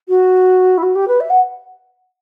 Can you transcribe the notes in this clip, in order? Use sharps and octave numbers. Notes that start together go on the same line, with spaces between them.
F#4
E4
F#4
G4
B4
E5
F#5